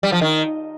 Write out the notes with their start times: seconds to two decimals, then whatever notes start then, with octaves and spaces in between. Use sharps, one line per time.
0.03 G3
0.12 F3
0.21 D#3